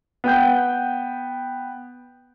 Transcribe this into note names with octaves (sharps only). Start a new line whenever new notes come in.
B3 G5 G6